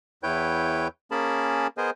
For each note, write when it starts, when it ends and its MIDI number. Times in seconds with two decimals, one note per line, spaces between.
0.23 0.88 40
0.23 0.88 64
0.23 0.88 71
0.23 0.88 73
0.23 0.88 79
0.23 0.88 91
1.11 1.67 58
1.11 1.67 61
1.11 1.67 68
1.11 1.67 70
1.11 1.67 81
1.11 1.67 83
1.78 1.90 59
1.78 1.90 68
1.78 1.90 70
1.78 1.90 72
1.78 1.90 75
1.78 1.90 80